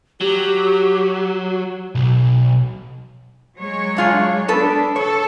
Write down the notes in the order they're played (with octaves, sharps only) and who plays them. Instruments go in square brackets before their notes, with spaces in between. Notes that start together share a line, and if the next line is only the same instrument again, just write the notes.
[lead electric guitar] F#3 [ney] G4
[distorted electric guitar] B1
[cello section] F#3 G#3 C#5
[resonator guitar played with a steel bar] D4 F4 G#4
[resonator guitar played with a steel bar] B3 A4 B4 [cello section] D4
[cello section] A4 [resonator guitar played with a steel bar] C#5